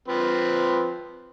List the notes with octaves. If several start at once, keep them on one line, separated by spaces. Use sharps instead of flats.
F3 C4 B4